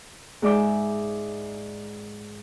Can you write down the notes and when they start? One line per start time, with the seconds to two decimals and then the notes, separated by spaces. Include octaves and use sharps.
0.42 G#2 G#3 D5 E5 D6 G6